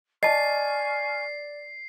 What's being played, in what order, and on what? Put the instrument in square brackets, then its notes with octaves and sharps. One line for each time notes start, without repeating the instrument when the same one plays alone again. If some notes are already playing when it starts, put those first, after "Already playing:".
[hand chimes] D5 A6 [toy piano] D#5 A5 [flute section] G#5 C#6 F6 [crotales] C7